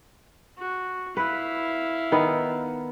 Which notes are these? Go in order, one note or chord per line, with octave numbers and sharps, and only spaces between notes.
F#4
E4 B4 F5
D#3 B3